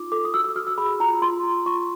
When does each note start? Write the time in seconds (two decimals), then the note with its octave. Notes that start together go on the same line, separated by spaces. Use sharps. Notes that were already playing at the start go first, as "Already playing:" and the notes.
Already playing: D#4 F4 D6
0.12 A4 D6
0.25 D#6
0.34 F#4 E6
0.44 E6
0.56 F#4 F6
0.67 E6
0.78 G#4 B5
1.00 F4 A#5
1.22 F4 C6
1.43 F4
1.66 F4 C#6